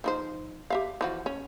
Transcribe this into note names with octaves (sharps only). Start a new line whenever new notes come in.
F3 D#4 C5
G4 E5 F5
E3 F3 F#4
C#4